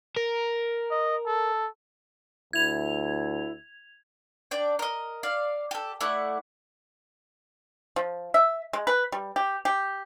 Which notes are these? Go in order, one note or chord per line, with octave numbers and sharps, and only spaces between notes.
A#4
D#5
A4
D2 E4 G#6 F7
D4 D5 G5
A#4 D#5
D5 F5
G4 A4
A3 E4 D5 F#5
F3
E5
G#3
B4
G3
G4
G4